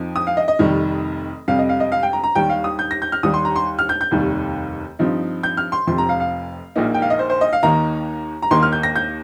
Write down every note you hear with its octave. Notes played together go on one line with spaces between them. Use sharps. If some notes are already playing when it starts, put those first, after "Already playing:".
Already playing: F2 F3 D#4
D#6
F5
D#5
D#5
F1 F2 D#3 G3
F2 C3 G3 F5
D#5
F5
D#5
F5
G5
A#5
A#5
D#2 D#3 G3 G5
F5
D#6
G6
A#6
G6
F6
D#2 D#3 G3 D#6
C6
A#5
C6
F6
G6
G6
F1 D#2 D#3 G3
G2 F3 C4 D#4
G6
F6
C6
F1 F2 F3 C6
A#5
F5
F5
A#1 A#2 A#3 D#4
G5
F5
D#5
C5
C5
D#5
F5
D#2 D#3 A#3 D#4 A#5
A#5
D#2 D#3 A#3 D#4 C6
F6
G6
A#6
G6